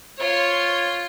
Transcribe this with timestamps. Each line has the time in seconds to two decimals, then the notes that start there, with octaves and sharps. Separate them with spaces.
0.19 F4 C#5